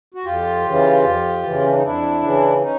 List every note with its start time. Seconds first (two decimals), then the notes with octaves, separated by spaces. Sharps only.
0.14 F#4
0.24 F2 F4 G4
0.65 C#3 E3
1.04 F2
1.43 C#3 E3
1.61 C#4
1.69 D4
1.76 D#4
1.83 F2 D4 E4
2.22 C#3 E3
2.62 C#4 D#4